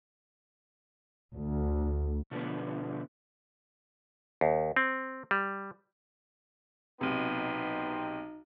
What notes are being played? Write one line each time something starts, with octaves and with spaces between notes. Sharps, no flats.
D2
B2 D3 F3 B3
D#2
C4
G3
B1 C3 B3 D#4 G5 C6